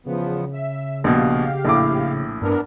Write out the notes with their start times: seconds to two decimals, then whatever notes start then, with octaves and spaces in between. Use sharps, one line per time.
0.06 E2 C#3 F3 B3
0.53 E5
1.04 A#1 B2 G4 F5
1.65 A#1 A2 D6
2.42 G2 B3 D4 A#4